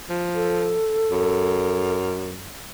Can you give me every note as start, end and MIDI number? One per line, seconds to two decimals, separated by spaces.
0.09 0.77 53
0.35 1.97 69
1.11 2.49 42